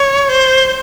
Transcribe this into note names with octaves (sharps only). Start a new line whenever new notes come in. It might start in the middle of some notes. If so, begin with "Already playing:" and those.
Already playing: C#5
C5
C5